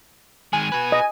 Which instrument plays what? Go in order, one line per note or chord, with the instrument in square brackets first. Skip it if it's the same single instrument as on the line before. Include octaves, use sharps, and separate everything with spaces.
[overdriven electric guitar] D#3 G#3 [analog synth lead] G#5
[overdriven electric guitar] F#4 B4
[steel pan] D#5